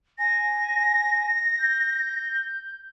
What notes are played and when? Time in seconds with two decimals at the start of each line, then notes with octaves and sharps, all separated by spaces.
0.18 G#5 A#6
1.59 G6